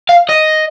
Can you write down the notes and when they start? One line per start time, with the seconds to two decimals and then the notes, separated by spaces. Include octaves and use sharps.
0.09 F5
0.29 D#5